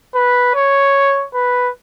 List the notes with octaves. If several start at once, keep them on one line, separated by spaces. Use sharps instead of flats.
B4
C#5
B4